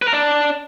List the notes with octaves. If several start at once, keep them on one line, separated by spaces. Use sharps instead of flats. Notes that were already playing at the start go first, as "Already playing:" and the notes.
B4
A#4
D4